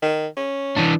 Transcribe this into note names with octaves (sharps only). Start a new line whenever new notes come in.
D#3
C#4
E3 D4